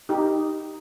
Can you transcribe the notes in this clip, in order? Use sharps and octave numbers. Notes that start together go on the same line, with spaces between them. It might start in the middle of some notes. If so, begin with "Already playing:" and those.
D#4 G4